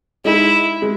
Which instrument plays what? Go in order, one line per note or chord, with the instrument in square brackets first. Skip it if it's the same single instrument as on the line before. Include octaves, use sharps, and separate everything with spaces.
[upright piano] G#3 D#4 G#4 [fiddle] E4
[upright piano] G#3